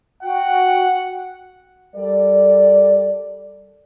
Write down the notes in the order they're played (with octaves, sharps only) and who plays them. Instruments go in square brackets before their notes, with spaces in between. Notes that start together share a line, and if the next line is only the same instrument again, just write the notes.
[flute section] F#4 G5 [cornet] F#5
[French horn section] G3 A4 A#4 D5